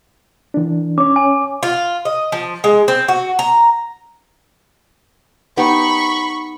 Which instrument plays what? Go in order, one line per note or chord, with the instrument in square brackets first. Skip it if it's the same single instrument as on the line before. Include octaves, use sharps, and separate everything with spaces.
[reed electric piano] E3 D4
[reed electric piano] C#4 C#5 [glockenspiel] D6
[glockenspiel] G#5
[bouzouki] F4
D#5
F3
G#3
C4
F#4
A#5
[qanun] B3 D#4 G4 [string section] B5 C#6